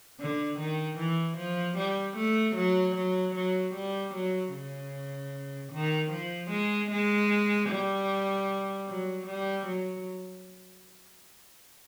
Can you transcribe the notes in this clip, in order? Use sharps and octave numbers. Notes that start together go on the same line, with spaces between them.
D3
D#3
E3
F3
G3
A3
F#3
F#3
F#3
G3
F#3
C#3
D#3
F3
G#3
G#3
G3
F#3
G3
F#3